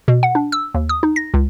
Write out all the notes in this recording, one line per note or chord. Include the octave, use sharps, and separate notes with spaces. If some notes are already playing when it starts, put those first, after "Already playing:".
B2
F#5
D4
E6
D#2
D#6
D#4
A#6
C#2